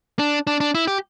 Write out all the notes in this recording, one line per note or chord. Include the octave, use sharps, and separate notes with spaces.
D4
D4
D4
E4
G4